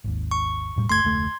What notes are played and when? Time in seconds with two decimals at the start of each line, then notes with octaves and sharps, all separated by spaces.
0.04 G#1 D#2
0.31 C#6
0.76 E1 A2 G3
0.89 G1 D2 A3 C6 G#6
1.04 F1 D2 A3